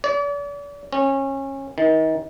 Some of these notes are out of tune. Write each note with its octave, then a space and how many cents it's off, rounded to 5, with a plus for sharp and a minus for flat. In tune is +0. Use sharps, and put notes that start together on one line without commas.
D5 -40
C#4 -25
D#3 +35